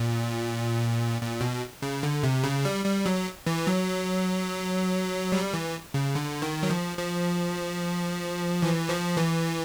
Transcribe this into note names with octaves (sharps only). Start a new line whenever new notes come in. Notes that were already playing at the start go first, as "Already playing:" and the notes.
Already playing: A#2
A#2
B2
C#3
D3
C3
C#3
G3
G3
F#3
E3
F#3
G3
E3
C#3
D3
D#3
F#3
F3
F3
E3
F3
E3